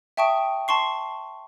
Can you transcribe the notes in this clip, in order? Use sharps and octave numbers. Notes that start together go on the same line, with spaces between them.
E5 G5 A5 C#6 D#6 D7
A5 C6 C#6 C7